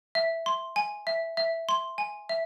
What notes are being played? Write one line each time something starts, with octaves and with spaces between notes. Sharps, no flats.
E5
C6
G#5
E5
E5
C6
G#5
E5